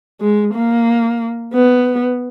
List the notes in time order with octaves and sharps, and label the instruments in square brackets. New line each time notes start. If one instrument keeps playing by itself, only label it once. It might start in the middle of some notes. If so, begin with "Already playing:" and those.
[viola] G#3
A#3
B3